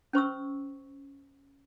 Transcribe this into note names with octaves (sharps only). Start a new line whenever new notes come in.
C#4 C5 C#6 E6